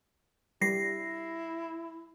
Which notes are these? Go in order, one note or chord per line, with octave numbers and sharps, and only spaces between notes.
G3 E4 A#6 C7